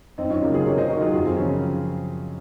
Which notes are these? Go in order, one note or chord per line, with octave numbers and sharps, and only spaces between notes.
F#2 C4 D#4
C#4 F4
C#3 F#3 A#3 C#4 F4
F4 G#4
C3 A#4 C#5
C5 D#5
D#3 F#3 F#4 A#4
F4 G#4
F#2 F4 G#4
C4
C#3 F3 C#4